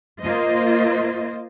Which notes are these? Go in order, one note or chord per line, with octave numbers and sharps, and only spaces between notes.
A#3 F4 C5 D#5